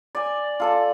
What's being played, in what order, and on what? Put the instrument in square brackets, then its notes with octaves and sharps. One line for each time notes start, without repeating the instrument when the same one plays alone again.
[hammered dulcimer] D5 G#5
F4 A4 D5